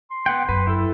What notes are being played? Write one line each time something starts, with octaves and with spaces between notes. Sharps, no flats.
C6
B3 F#5 G5
F#2 B4
E4 A4